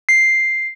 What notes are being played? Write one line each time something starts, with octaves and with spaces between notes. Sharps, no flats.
C7